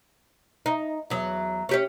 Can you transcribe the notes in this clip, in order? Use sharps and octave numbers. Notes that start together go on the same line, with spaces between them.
D#4
E2 F#3
C#4 G4 C#5